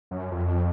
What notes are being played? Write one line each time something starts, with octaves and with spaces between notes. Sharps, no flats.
F#2
F2